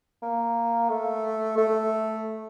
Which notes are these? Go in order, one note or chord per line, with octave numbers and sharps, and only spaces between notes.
A#3
A3
A3